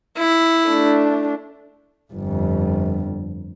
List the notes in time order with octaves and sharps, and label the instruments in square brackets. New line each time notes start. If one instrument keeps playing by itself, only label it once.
[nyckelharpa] E4
[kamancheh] A3 D4
[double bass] G1 F2